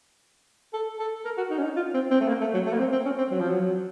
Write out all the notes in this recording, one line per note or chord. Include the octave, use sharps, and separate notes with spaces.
A4
A4
A#4
F#4
D#4
C#4
D#4
F4
C4
C4
A3
A#3
A3
F#3
A3
A#3
C4
C4
C#4
C4
F#3
F3
F#3